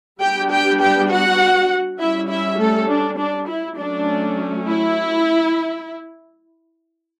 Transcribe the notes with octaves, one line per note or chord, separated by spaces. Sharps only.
G3 B3 D4 G4 G5
G4 G5
G4 G5
F#4 F#5
G3 C#4 E4 E5
E4 E5
A3 A4
D4
D4
E4
F#3 A3 C#4 D4
E4